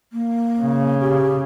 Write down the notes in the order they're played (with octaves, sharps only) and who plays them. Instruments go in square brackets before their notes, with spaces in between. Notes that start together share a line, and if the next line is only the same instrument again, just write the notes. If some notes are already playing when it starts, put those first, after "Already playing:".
[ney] A#3
[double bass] C#3
[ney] G4